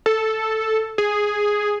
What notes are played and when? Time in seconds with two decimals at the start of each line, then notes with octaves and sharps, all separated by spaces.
0.06 A4
0.98 G#4